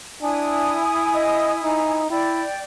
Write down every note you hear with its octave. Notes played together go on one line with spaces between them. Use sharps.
D4 E4 G#5 D#6
D#5
D#4
E4 D5 G5